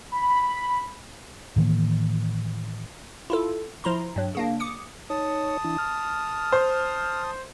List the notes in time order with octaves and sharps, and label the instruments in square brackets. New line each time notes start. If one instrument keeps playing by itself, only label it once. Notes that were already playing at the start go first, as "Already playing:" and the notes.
[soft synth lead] B5
[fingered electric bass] A2 D#3 E3 A#3
[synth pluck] E4 F4 A4
F3 E4 A#5 C6
G2 F#3
C#3 A#3 D4
D6 D#6 C#7
[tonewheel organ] D#4 C#5 [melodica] A5 D#6
[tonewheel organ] E3 D4 E4
F6
[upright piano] C5